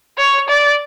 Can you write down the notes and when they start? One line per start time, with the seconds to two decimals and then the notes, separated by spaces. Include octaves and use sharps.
0.18 C#5
0.48 D5